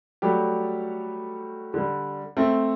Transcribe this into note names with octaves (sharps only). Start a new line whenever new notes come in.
F#3 G3 A3 G4
D3 G3
A3 C4 E5